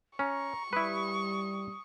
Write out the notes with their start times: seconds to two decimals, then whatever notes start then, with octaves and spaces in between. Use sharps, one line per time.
0.19 C#4 A#5 C#6
0.73 G3 E4 B4 D#6